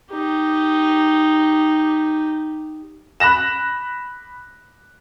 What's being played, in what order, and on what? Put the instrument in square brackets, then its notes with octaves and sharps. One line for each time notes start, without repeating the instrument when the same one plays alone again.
[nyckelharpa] D#4 G4
[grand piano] B5 F#6 A#6 E7